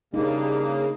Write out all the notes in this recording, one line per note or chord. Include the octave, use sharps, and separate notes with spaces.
C#3 G3 A#3 D4 D#4